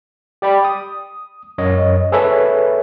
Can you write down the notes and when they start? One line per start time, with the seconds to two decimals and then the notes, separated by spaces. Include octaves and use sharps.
0.42 G4 D5 G5 B5
0.64 D#6
1.58 F#2 C#5 D#5
2.12 G#4 A4 B4 C#5 E5 G#5